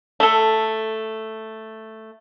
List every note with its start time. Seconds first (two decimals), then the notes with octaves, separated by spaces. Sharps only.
0.20 A3 A4